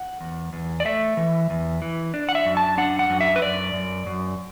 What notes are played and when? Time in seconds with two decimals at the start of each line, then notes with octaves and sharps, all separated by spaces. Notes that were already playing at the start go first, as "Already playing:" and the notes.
Already playing: F#5
0.21 E2
0.53 E2
0.80 D5
0.85 A3 E5
1.17 E3
1.50 E2
1.82 E3
2.14 D4
2.29 F#5
2.35 E5
2.45 F#2
2.57 A5
2.78 D4 F#5
2.99 F#5
3.10 F#2
3.21 E5
3.36 B4
3.42 F#2 D5
3.74 F#2
4.06 F#2